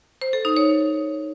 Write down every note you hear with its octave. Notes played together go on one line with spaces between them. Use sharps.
C5
A4
D#4
C#5